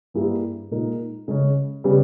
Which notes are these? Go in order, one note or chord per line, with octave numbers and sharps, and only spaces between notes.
G2 G3 A#3 E4 G#4
A#2 G#3 D#4 A#4
C#3 G#3 C#4
C#3 G3 B3 G4